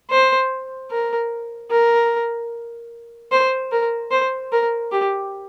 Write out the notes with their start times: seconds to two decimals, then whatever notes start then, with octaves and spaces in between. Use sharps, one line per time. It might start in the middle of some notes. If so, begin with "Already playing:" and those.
0.11 C5
0.91 A#4
1.71 A#4
3.32 C5
3.72 A#4
4.11 C5
4.52 A#4
4.92 G4